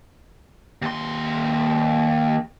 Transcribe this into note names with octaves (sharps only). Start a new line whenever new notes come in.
D#2 C6